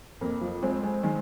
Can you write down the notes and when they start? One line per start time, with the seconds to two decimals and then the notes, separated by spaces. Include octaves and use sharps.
0.21 F2 A#3
0.41 F3
0.63 G#3 C4
0.83 G#3
1.03 D#3 G#3